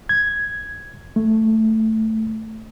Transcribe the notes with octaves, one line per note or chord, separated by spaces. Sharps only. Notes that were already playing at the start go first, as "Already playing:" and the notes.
G#6
A3